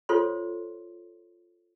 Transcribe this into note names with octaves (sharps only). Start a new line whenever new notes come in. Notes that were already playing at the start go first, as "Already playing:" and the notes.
F4 A4 C5 C#5 C6